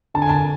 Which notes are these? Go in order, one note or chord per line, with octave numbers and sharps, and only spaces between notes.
D3 A5
G#5
A5